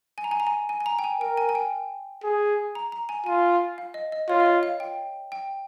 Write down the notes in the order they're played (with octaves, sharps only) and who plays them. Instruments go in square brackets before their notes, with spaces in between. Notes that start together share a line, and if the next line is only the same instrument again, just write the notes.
[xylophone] G#5
A#5
G#5
A#5
G#5
G#5
G#5
A#5
G5
G#5
[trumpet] A#4 [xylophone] G5
[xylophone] G#5
G#5
G5
[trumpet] G#4
[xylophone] A#5
A#5
G#5
[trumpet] F4 [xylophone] G#5
[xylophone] F5
D#5
D#5
[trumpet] F4 [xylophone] C#5
[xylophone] D#5
C#5
F5
G5
G5